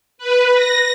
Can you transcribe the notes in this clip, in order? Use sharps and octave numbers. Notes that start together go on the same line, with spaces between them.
B4
A#6